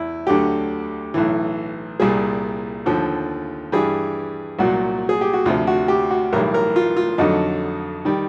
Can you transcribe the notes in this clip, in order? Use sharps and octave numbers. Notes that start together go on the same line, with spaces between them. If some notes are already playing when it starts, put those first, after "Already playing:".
Already playing: E2 E4
D2 D3 F#3 G4
B1 A2 E3
C2 A#2 G3 G#4
D#2 D3 F3
G2 E3 G3 G#4
C2 A#2 F#3 F#4
G#4
G4
F#4
D2 C3 F3 F4
F#4
G4
F#4
B1 A2 E3 G3 A#4
A#4
F4
F4
F2 D3 F#3 D#4
D#3 G3